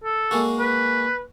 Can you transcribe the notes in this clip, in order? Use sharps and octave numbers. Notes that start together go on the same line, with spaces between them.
A4
G#3 A#3 F#4
B4